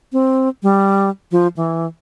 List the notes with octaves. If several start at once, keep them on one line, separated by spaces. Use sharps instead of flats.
C4
G3
F3
E3